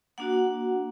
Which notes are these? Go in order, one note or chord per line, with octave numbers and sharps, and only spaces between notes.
A#3 D4 F#4 F#5